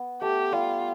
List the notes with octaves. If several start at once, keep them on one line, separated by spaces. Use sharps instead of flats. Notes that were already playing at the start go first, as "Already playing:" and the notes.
Already playing: B3
A3 G4
G3 F4